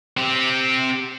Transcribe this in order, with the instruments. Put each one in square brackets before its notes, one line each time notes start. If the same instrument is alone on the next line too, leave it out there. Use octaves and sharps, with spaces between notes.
[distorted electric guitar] C4 G4